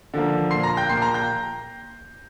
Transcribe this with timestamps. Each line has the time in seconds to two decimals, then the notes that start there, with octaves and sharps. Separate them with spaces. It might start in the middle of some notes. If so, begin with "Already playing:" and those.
0.14 D3 F3 A#3
0.51 A#2 A#3 C6 C7
0.63 A#5 A#6
0.77 G5 G6
0.89 A#2 A#3 C6 C7
1.02 A#5 A#6
1.14 G5 G6